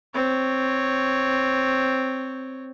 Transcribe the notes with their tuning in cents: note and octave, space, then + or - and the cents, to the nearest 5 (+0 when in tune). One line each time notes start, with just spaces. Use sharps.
C4 +0 C#5 +0